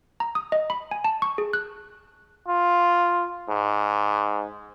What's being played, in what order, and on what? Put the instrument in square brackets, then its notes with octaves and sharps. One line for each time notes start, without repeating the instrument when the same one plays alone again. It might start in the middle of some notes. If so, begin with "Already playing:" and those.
[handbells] A#5
D#6
D#5
B5
G#5
A5
C#6
G#4
F#6
[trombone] F4
G#2